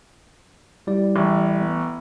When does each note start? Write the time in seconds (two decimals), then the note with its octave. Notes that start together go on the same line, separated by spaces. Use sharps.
0.87 G3 E4 D5
1.16 A1
1.61 B3